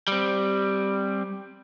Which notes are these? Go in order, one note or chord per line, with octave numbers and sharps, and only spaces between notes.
G3 C4